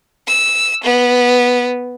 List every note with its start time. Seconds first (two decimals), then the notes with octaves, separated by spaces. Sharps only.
0.27 E6
0.84 B3